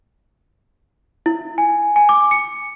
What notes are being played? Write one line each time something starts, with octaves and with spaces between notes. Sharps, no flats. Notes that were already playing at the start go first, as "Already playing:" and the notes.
E4
G#5
G#5
D6
C#7